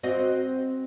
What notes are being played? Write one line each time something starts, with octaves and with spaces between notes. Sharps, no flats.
C4 F#4 D#5